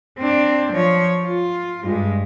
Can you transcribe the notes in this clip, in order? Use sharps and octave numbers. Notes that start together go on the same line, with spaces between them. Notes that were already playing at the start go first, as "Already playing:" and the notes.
C4 D4
F3 C#5
F4
G2 G#3